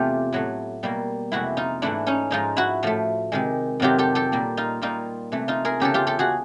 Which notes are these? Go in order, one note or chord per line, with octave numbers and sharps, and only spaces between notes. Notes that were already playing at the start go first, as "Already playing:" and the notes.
Already playing: E2 C3 F3 A3 F4 G4
A2 F#3 A3
B2 G3 A#3
F2 C3 E3 G#3 E4 F#4
D#4 F4
G#2 E3 A3 D4 E4
C#4 D#4
G#2 F3 G#3 D#4 F4
E4 F#4
A2 F3 A3
C3 D#3 G#3
F2 C3 D#3 F#3 F4 G4
G4 A4
G4 A4
A#2 G3 A#3
D#4 F4
A#2 G3 A#3 D#4 F4
C3 E3 A3
D#4 F4
G#4 A#4
E2 C#3 E3 G4 A4
F4 G4
G4 A4
F#4 G#4